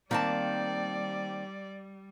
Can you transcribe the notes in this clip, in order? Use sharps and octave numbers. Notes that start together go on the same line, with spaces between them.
D#3 G3 A#3 C4 D5 A5